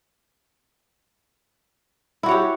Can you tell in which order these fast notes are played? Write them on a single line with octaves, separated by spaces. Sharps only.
E4 F#4 C#5 G4